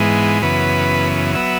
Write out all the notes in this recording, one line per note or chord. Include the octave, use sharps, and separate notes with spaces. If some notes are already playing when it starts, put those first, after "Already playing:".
Already playing: G#2 E3 G#3 B3
F#2 C#3 E3 B3 B4
F#3 B3 E5